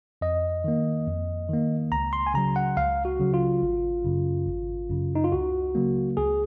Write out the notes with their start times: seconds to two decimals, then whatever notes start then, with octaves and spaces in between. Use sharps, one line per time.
0.21 F2 D#5
0.64 D#3 A#3
1.07 F2
1.49 D#3 A#3
1.92 C#2 A#5
2.13 C6
2.27 G#5
2.34 C#3 F#3 A#5
2.56 F#5
2.77 C#2 F5
3.05 F#4
3.20 C#3 F#3
3.34 F4
3.62 G#1
4.04 F#2 C#3
4.47 G#1
4.90 F#2 C#3
5.15 D#4
5.24 F4
5.32 C#2 F#4
5.75 C#3 F#3 A#3
6.17 C#2 G#4